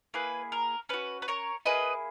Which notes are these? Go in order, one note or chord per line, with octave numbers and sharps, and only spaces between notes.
A#3 E4 G#4 B4
A#4
C#4 F#4 B4
B4
A#4 C#5
A#3 E4 G#4 B4 D#5